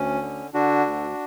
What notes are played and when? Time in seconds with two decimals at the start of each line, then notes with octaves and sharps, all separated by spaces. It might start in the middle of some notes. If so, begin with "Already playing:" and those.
Already playing: D2 C#4
0.21 D3
0.54 D3 D4 F#4
0.86 D2